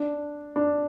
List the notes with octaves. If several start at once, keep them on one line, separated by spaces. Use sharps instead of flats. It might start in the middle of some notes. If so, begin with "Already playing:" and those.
Already playing: D4
D4